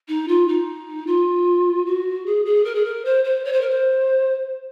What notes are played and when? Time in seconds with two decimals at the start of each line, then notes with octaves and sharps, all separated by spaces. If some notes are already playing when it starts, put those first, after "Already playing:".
0.08 D#4
0.28 F4
0.48 D#4
1.07 F4
1.86 F#4
2.26 G#4
2.45 G#4
2.64 A#4
2.75 G#4
2.84 A#4
3.05 C5
3.24 C5
3.45 C#5
3.52 C5
3.61 A#4
3.70 C5